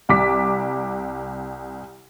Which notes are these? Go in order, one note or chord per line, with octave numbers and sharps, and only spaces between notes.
C2 D6 B6